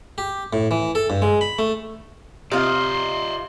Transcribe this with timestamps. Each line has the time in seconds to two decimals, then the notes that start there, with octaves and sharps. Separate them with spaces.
0.18 G4
0.53 A2
0.71 E3
0.95 A4
1.10 G2
1.22 G#3
1.41 B5
1.59 A3
2.52 C3 D#4 F4 D5 D#5 C6